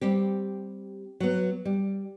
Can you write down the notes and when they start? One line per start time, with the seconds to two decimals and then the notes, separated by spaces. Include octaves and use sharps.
0.01 G3 C4 G4
1.20 F#3 B3
1.65 G3